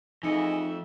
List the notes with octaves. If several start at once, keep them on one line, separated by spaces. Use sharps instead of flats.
F2 E3 A3 D#4 G#4 D#5 E5 C#7